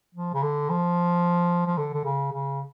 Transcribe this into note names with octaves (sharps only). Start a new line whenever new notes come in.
F3
C#3
D3
F3
F3
D3
D3
C#3
C#3